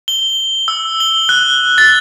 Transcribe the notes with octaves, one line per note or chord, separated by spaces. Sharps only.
G7
E6
G7
F#6
A6